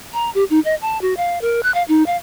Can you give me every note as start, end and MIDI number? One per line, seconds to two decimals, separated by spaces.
0.13 0.30 82
0.35 0.44 67
0.50 0.60 63
0.65 0.75 75
0.81 1.01 81
1.02 1.16 66
1.17 1.39 77
1.41 1.63 70
1.63 1.71 90
1.74 1.83 77
1.88 2.06 63
2.06 2.16 77